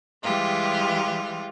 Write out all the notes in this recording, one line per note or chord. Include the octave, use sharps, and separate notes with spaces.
E3 G3 G#3 F4 G4